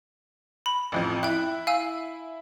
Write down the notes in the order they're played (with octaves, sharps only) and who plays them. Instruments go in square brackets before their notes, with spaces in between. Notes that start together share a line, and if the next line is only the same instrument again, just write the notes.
[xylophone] B5
[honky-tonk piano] A1 F2 F3
[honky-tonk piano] E4 [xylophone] G5 F#6
[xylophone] F5 G#5 E6